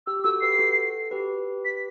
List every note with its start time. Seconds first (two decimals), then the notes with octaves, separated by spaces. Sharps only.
0.07 G4 E6
0.19 G4
0.24 F#4 A4 E6
0.41 G4 B4 C7
0.59 F#4 A4
1.11 G4 B4
1.65 B6